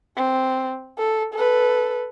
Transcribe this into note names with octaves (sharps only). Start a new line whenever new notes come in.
C4
A4
A4 B4